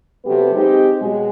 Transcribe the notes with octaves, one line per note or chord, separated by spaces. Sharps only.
C3 F#3 A3 B3 G4 B4
G#3 C4 D#4 G4
B2 F#3 G#3